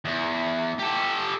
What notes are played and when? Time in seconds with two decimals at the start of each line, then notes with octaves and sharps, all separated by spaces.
0.05 E2
0.79 G4 A4